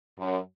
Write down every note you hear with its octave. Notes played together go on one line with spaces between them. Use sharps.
F#2